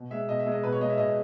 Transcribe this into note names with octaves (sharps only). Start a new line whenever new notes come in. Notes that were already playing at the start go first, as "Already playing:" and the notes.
Already playing: B2
G#3 E5
B2 D#5
E5
G#3
D#5
B2 B4
C#5
G#3 D#5
E5
B2 D#5